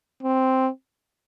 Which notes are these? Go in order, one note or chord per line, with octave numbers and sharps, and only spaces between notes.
C4